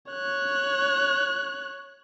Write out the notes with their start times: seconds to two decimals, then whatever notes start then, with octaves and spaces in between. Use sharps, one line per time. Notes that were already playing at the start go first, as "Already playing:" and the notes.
0.12 C#5 F#6